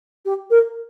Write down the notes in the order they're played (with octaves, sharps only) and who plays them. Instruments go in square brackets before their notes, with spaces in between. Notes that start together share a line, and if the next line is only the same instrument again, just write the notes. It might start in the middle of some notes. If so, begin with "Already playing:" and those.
[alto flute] G4
A#4